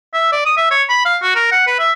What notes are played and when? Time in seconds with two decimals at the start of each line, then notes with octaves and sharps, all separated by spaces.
0.13 E5
0.32 D5
0.45 D#6
0.57 E5
0.70 C#5
0.89 B5
1.05 F5
1.22 F#4
1.35 A#4
1.51 F#5
1.67 B4
1.79 E5